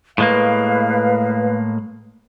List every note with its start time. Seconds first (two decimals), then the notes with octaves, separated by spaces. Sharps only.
0.18 A2 G#3 A#3 B4 F5